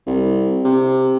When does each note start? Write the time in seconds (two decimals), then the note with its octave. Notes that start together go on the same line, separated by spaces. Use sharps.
0.07 C2
0.65 C3